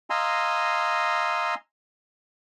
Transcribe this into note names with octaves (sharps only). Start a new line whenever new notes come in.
D#5 F5 G#5 A#5 C6 E6